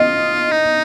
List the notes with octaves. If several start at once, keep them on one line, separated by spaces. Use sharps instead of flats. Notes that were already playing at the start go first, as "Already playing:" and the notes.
Already playing: F4 D#5
D#4